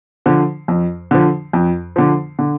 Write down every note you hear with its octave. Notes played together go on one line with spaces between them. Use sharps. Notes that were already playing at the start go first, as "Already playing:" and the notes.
D3 F3
F2
D3 F3
F2
D3 F3
D3